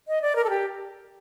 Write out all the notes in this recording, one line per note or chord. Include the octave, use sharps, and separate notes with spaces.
D#5
D5
A#4
A4
G4